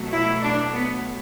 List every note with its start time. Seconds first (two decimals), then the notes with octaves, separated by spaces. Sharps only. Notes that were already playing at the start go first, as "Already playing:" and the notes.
Already playing: B2 F#3 A3
0.12 E4
0.43 D4
0.73 B3